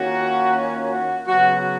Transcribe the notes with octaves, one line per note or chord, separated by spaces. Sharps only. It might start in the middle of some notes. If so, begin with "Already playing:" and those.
Already playing: D#3 A#3 C#4 F4 F#4
F#4
C#3 F#3 B3 F#4